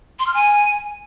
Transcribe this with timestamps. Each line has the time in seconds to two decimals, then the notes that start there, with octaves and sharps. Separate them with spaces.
0.19 C6
0.27 F6
0.34 G#5